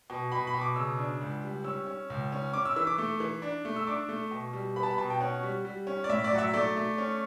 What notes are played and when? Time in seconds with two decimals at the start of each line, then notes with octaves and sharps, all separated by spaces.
0.10 B2
0.32 B2 B5
0.47 B5
0.54 B2
0.61 D6
0.76 C#3 E6
0.98 D4
1.21 C#2
1.43 G3
1.64 C#4 E6
1.87 C#4
2.10 C#2
2.32 C#4
2.53 C#4 D6
2.65 E6
2.76 E3 E6
2.87 D6
2.98 A3
3.20 E3
3.42 D4
3.65 A3
3.76 E6
3.87 D4 D6
4.09 A3
4.31 B2
4.53 G3
4.76 B3 B5
4.83 A5
4.90 B5
4.98 B2 A5
5.10 G5
5.21 C#4 F#5
5.43 G3
5.65 G3
5.87 C#4
6.04 D5
6.09 A2 E5
6.24 D5
6.32 F#3 F#5
6.38 E5
6.53 A3 D5
6.76 A3
6.98 C#4